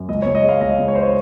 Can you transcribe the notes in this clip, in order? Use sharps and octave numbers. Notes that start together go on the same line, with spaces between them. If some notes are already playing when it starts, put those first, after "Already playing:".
Already playing: F#2
C#2 D#5
C#5
C#2
D#5
G#3
F5
C#2 D#5
C#2
C#5
C5
C#5